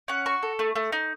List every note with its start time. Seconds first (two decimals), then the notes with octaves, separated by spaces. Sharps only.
0.08 C#4 F#5
0.26 F#4 C#6
0.43 A4
0.59 A3
0.76 A3
0.92 D#4